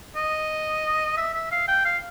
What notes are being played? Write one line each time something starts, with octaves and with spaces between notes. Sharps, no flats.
D#5
E5
E5
F5
G5
F5